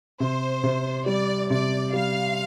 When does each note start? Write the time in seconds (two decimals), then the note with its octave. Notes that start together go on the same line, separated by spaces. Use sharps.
0.20 C3 C5
0.63 C3
1.06 G3 D5
1.50 C3 D5
1.93 G3 F5